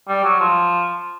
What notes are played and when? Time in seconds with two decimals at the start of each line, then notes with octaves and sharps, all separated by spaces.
0.08 G3
0.24 F#3
0.40 F3